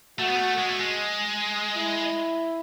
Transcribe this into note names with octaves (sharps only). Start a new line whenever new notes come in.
A3 F#4
B3
A3
G#3
A3
G#3
E4